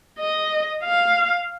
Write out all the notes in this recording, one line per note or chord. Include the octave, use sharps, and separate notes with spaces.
D#5
F5